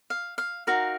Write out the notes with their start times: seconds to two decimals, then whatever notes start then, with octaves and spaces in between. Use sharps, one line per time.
0.10 F5
0.38 F5
0.67 D#4 F#4 A#4 F5